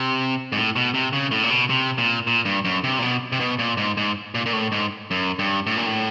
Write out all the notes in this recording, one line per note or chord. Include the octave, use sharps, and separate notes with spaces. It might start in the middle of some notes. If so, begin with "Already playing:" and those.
Already playing: C3
G#2
A2
B2
C3
C#3
A2
A#2
B2
C3
A#2
A#2
G2
F#2
C3
A#2
B2
C3
B2
A#2
G#2
G#2
A#2
A#2
A2
G#2
F#2
G2
A2
A#2
A2